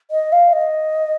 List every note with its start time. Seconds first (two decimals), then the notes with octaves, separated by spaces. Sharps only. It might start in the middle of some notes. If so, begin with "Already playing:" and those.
0.10 D#5
0.32 F5
0.52 D#5